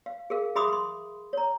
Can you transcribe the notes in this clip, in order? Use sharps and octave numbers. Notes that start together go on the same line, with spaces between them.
F5
G#4 A#4 F5
G#4 E5 B5 C6 D6 D#6
C6
C#5 A#5